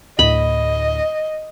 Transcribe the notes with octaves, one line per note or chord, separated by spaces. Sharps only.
D2 A2 D#5 B5